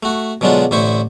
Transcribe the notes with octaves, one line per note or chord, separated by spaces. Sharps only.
A3 F#4
B2 D3 F#3 G#3 D4 F4
A1 D3 E4 C5 C#6